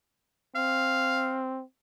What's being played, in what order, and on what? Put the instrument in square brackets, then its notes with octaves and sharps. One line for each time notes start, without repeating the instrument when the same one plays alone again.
[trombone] C4 [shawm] F5